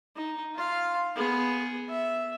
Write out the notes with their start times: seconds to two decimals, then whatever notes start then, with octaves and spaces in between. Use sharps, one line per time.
0.16 D#4
0.55 F4 F5
1.15 B3 G#4
1.89 E5